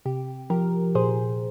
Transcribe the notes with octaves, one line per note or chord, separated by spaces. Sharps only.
C3 G4
F3 G4 A#4
A#2 G#4 C5